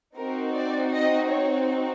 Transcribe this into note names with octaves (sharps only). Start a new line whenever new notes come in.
C4 D#4 F#4 A#4
D5
D#5
C#5